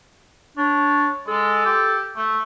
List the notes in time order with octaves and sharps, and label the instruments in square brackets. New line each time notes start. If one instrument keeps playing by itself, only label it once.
[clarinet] D4 [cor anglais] C#5
[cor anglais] G#3 [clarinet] A4
[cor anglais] G4
A3